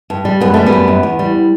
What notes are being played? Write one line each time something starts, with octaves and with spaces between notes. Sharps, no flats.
G2
G3
F#2 B3
G3 A3
B3
F#2
F#2
E2
G3